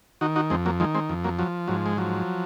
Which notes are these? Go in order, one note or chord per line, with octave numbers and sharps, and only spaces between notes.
D#3 D#4 F#4
D#4 F#4
F2 G#3 C4
F#3 A#3
D#3 F3 G#3
G#3 C4
F2
F#3 A#3
F3 F#3
G#2 F#3
G#3
F3 F#3